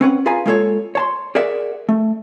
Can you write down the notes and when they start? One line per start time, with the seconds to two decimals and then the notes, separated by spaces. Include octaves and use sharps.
0.01 C4 C#4 B4 F#5
0.26 F4 G#4 B4 F5 G#5 A#5
0.46 G#3 A#3 F4 A4 A#4 C#5
0.95 C#5 A5 C6
1.35 G#4 A#4 D5 E5 F#5
1.89 A3